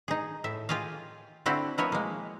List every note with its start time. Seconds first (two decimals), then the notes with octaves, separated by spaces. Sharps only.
0.08 D#4 G#4
0.44 A2 E5
0.69 F4 G4 G#4 D#5 F5
1.46 D3 C4 E4 F#4 G4
1.78 F3 B3 E4 A#4 C#5 D#5
1.92 G#3 A#3